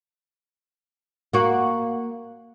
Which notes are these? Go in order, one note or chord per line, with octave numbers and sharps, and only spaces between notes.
A#3 F#4